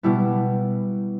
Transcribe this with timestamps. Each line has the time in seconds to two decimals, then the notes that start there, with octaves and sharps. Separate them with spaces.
0.03 B2 G3 B3 E4